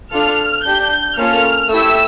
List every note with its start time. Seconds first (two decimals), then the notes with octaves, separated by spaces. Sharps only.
0.12 D4 F4 A4 F6
0.65 D4 G4 G6
1.18 A#3 C#4 F4 A4 F6
1.71 A3 E4 G4 E6